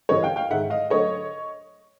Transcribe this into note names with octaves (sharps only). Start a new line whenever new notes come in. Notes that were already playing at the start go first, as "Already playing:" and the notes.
G2 E3 G3 C#5 D#5
F5 G5
F5 G5
G#2 D#3 G#3 E5 F#5
D#5 F5
D3 F#3 A3 C#5 D#5